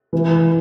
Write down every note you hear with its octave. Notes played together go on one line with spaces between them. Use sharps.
E3